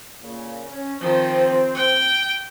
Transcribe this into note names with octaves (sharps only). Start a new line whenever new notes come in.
A#2 C#3
C#4
D#3 F3 C4
G5